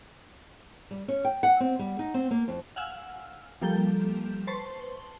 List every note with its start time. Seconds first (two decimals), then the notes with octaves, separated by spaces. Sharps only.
0.91 G3
1.08 C#4
1.25 G5
1.43 F#5
1.60 C4
1.79 G3
1.99 D#4
2.14 C4
2.31 A#3
2.48 F2
2.76 F5 F#5 G#5 E6 F6
3.61 F3 G3 A#3 A4 G5 G6
4.47 B4 C5 A5 C6 C#6